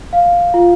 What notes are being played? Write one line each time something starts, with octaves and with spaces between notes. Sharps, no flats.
F5
F4